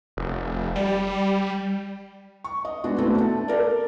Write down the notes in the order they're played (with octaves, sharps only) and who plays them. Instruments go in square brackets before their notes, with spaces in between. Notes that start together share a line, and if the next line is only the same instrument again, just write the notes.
[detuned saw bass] F1
G3
[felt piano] C#6
D#5
G#3 B3 D4 F#4
A3 B3 C4 D4 E4 F#4
A5
A4 A#4 D5